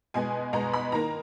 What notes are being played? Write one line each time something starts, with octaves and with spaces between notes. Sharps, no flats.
B2 G#3 B3 G#5
B2 G#3 B3 A#5
B5
D#3 A#3 A#5